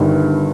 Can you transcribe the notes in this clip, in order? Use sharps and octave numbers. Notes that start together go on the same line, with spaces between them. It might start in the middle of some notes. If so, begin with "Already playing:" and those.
Already playing: G1 G2 D#3